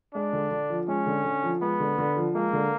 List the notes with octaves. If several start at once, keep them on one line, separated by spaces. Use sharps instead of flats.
G#3 D4
D3
D3
F3
G#3 C#4
D3
D3
F3
G#3 B3
D3
D3
F3
G#3 A#3
D3